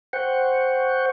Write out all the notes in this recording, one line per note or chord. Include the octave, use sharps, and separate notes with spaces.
C5 F#5 G5 C#6